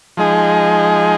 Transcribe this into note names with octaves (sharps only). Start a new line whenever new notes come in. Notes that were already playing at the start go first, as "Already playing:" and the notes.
F3 G#3 D#4 G#4